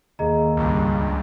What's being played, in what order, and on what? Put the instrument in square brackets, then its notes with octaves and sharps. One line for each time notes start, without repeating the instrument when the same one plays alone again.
[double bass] D#2 [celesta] G#4 D#5 A#5
[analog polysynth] C#2 G2